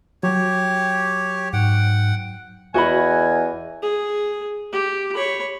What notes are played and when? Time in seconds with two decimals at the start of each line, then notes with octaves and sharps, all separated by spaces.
0.23 F#3 G4 C#5
1.53 G#2 F#5 G5
2.74 E2 F#4 D#5 G#5 B5
3.82 G#4
4.72 G4
5.14 C#5 B5